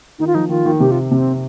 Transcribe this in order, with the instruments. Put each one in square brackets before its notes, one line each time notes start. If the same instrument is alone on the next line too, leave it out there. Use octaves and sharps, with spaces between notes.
[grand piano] D#3 [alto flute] D#4
[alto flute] F4
[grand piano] F3 [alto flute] D#4
[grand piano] D#3 [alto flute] F4
[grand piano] D#3
[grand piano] C3 [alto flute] G4
[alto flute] F4
[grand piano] C3 [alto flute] C4